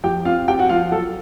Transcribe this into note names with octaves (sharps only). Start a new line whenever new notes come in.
F3 G4 G5
C4 F4 F5
C4 G4 G5
F#4 F#5
F3 F4 F5
F#3 A4